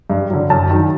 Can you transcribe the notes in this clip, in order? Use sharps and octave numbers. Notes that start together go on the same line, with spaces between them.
G2
D3 F#3
F#2 A5
D#3 F#3